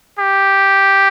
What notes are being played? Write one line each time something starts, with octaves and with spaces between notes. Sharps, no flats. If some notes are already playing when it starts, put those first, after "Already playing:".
G4